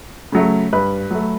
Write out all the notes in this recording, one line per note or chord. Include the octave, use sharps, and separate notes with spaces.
C#3 F#3 A3
G2 B4
F#3 A3